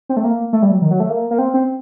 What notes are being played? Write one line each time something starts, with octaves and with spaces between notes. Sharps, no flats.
C4
A3
A#3
A3
G3
F#3
D#3
F#3
A3
A#3
A#3
C4
C4